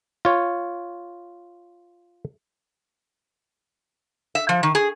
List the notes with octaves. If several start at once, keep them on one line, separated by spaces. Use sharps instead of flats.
F4 C#5
E5
F3
D#3
G#4